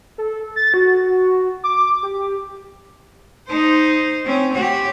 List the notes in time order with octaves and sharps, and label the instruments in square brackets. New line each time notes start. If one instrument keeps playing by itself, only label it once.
[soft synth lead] A4
A6
F#4
D6
G4
[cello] D#4 C5
C4 C#4
G4 C#5